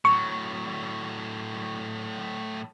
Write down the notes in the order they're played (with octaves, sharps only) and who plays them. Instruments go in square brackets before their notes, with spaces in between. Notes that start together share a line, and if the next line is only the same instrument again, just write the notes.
[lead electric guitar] A2 F#3 [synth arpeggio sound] C#6